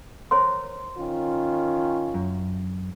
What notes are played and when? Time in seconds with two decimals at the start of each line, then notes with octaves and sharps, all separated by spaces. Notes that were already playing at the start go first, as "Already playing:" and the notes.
0.31 A#4 C5 C#5 C6
0.97 D#3 C#4 F4
2.14 F#2